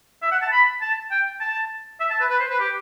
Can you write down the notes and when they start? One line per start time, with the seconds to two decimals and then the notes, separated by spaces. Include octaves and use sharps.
0.22 E5
0.31 F#5
0.42 A5
0.52 B5
0.81 A5
1.11 G5
1.40 A5
2.00 E5
2.10 A5
2.20 B4
2.30 B4
2.40 C5
2.50 B4
2.60 G4